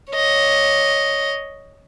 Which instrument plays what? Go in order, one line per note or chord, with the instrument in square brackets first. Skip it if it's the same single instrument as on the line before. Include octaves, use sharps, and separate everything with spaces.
[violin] C#5 D#5